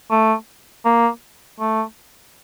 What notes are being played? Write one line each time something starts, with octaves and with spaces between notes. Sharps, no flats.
A3
A#3
A3